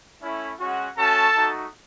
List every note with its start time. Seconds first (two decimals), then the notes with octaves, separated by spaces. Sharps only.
0.21 A3 C#4 E4
0.60 G#3 C#4 F#4
0.97 A3 C#4 F#4 A4 A5
1.35 A3 D#4 F#4